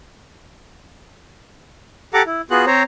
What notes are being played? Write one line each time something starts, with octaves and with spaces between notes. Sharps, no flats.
G4 A4 F#5 A#5 D6
E4
B3 F4 F#4 G#4 F#6
C4 C5 C#5 A#5